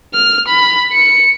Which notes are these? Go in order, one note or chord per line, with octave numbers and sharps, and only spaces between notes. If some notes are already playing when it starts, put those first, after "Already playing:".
F6
B5
C#7